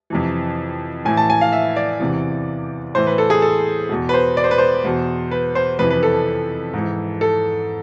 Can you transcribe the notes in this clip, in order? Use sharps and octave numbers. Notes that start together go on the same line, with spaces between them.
F2 C3 E3
A2 E3 G#5
A5
G#5
F5
E5
D5
E2 C3 E3
A2 E3 C5
B4
A4
G#4
A4
E2 B2
B4
C5
D5
C5
B4
C5
E2 B2
B4
C5
F2 C3 E3 B4
B4
A4
G#2 E3
A4